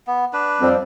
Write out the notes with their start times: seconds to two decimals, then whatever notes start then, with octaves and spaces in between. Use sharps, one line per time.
0.07 B3
0.33 D4 B4
0.61 F2 G3 C4